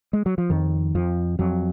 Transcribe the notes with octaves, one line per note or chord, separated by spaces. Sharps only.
G#3
F#3
F3
F2 D#3
F2 F3
F2 F#3